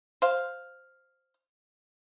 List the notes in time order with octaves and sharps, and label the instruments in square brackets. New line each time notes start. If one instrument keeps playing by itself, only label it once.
[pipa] C5 F5